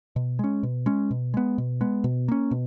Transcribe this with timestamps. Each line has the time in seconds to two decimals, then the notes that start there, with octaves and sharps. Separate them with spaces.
0.16 B2
0.39 G#3 C#4
0.63 B2
0.86 G#3 C#4
1.11 B2
1.34 G#3 B3
1.58 B2
1.81 G#3 B3
2.04 B2
2.28 A#3 C#4
2.51 B2